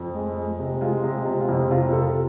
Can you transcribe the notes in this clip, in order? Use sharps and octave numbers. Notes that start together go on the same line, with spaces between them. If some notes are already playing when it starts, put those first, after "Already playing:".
Already playing: F2
G#3
G#3
C3
G#3 F4
C3
C3
F4
F2
C3 F4
C3 A4